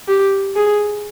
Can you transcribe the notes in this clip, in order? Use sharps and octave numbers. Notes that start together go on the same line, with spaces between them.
G4
G#4